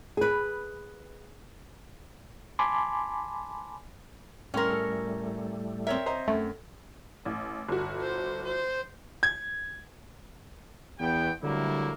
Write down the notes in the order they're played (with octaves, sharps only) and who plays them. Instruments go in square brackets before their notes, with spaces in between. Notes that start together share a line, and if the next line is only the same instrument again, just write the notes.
[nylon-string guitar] G#4 B4
[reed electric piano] G#5 A5 B5 C6 D6
[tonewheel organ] A2 G3 A3 [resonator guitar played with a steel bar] C#4 A#4 [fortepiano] G5 C6
[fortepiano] A4
[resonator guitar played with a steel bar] C4 C#5 E5 [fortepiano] A#4
[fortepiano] C5 D#5 A#5
[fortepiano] F#2 [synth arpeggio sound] A3
[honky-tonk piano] A1
G1 F#4
[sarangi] C5
C5
[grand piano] G#6
[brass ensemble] E2 B3 G5
D3 F#3 G3 A3 A#3 E4